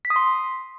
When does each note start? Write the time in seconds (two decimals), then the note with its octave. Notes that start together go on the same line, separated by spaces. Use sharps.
0.05 B6
0.10 D#6
0.16 C6